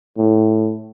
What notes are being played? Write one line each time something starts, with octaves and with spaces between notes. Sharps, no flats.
A2